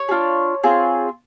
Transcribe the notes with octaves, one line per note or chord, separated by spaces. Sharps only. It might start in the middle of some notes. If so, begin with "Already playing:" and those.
Already playing: C#5
G#4
D4 F4
C4 F4 G#4